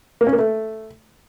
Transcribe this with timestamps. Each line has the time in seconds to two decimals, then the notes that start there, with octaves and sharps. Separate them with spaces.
0.21 A#3
0.27 C#4
0.33 A#3
0.39 A3